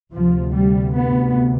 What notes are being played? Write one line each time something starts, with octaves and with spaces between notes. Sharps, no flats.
D2 C3 F3
G3
B3